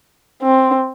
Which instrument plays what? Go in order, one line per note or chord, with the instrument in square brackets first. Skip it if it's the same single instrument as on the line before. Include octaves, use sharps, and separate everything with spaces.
[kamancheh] C4